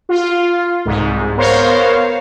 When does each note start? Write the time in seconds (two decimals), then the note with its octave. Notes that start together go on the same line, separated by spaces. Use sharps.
0.09 F4
0.86 C2 G#2
1.37 B3 A#4 C5 C#5 F5